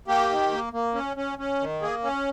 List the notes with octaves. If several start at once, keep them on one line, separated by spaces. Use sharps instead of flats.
A#3 G4
D#3
A#3
A#3
C#4
C#4
C#4
D#3
A#3 G#4
C#4